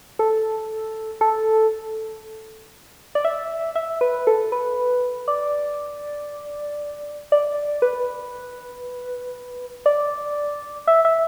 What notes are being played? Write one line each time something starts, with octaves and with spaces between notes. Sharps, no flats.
A4
A4
D5
E5
E5
B4
A4
B4
D5
D5
B4
D5
E5
E5